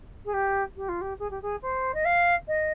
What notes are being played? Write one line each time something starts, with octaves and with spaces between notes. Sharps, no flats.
G#4
G4
G4
F4
G4
G#4
G4
G#4
C5
D#5
F5
D#5